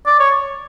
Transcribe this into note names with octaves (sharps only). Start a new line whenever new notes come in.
D5
C#5